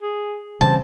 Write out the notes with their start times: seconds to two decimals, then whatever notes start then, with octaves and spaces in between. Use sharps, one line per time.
0.02 G#4
0.61 C#3 E3 G3 C4 A5